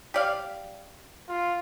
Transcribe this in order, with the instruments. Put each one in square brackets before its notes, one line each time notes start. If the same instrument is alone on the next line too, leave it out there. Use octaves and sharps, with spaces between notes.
[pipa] G4 D5 F5
[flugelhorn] F4